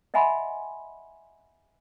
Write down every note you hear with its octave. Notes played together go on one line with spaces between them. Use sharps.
D#5 E5 F#5 G#5 B5 C6